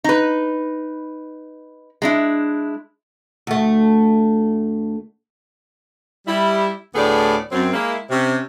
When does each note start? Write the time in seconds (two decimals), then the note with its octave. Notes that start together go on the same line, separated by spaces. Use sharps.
0.04 D#4 B4
2.02 G#3 D4 E4
3.47 D2 A3
6.27 G3 E4
6.95 D2 A2 B3 G#4 A4 D5
7.52 F#2 C4
7.73 G#3 A#3 E4
8.10 C3 C#4